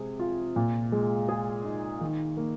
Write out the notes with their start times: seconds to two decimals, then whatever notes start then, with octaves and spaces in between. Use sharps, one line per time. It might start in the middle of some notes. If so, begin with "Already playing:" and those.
Already playing: C3 G#3 G#4
0.20 F4
0.56 A#2
0.92 G#3
1.29 G#4
1.65 D#4
2.01 D#3
2.37 A#3